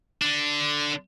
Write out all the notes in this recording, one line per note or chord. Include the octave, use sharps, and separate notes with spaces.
D3 D4